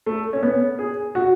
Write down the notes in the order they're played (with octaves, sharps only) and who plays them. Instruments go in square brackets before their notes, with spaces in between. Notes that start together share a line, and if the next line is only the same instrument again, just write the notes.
[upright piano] A3
C#4
B3
G#4
F#4